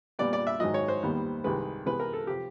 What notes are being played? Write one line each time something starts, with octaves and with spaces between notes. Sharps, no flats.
A#2 G3 B3 D5
D5
E5
G#2 D#3 F#3 D#5
C#5
C5
D#2 D#3 G3 B3
C2 C3 D#3 G#3 B4
C3 E3 G#3 B3 B4
A#4
A4
C3 F3 G4